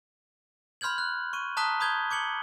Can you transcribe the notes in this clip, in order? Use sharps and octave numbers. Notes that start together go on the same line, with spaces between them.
B5 C6 F6 G6 G#6 F#7
F#6
C#6 D#7
A5 A#5 D#6 F#6 B6 G7
B5 D#6 G6 G#6 G7
D6 G#6 C#7 F#7 G7